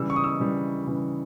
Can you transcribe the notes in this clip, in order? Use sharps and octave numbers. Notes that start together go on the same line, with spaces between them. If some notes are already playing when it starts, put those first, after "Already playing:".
Already playing: C#3 E3 G3 E6
C#6
D#6
E6
C#3 E3 G3
C#3 E3 G3